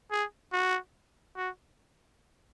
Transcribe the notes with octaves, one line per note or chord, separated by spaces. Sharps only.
G#4
F#4
F#4